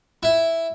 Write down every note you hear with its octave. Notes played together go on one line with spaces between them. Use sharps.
E4